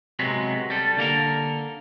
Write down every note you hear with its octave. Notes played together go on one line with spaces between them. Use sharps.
C3 F#3 G#3 B3
G3 A4
D3 A#3 A4 A#4